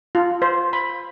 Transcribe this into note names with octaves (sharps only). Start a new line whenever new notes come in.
F4
C5
B5